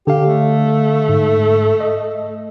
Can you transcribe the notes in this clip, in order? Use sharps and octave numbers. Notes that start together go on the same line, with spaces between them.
D3 G4 F5
A3
G#2
D#5